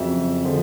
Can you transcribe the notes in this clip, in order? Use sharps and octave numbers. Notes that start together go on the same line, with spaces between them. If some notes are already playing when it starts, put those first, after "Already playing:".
Already playing: F2 C#3 F#3 E5
D3 F3 G#3